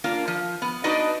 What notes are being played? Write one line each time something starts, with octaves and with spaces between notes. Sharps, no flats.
A#3 D4 F4
F3
B3
D4 D#4 F#4 B4 D5 D#5